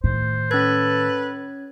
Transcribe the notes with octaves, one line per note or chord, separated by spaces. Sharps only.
A2 D#3 C5
C#4 A4 B4 G#6